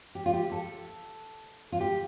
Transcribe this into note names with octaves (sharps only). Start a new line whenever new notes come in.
G4
F4
G4
A4
F4
G4